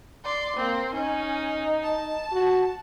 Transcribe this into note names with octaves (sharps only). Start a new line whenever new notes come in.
D5 C6
A#3 C4
C#4 D#4
A5
F#4